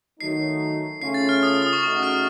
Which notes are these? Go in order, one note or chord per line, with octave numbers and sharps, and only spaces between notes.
D#3 F#3 A3 D#4 C7
C#3 A3 C#4 F4 C7
A6
F6
D#6
D#6
C#6
C#3 A3 D#4 F#4 C#6
F6